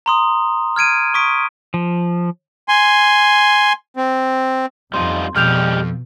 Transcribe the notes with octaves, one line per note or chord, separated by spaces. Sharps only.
A#5 C6 D#6
F6 G#6 D7 D#7
C#6 D#6 B6 D7
F3
G#5 C6
C4
F2 G3 D#4 F4 C6
F2 B2 G3 G#3 G4 F6 G6 F7